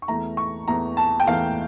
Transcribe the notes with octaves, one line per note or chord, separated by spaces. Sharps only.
C#6
E2 E3 A3 A#5
C#6
E2 E3 A3 A#5
A5
G5
E2 E3 A3 F5